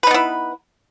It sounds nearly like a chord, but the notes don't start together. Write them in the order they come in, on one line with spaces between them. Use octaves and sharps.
B4 D#4 B3 E4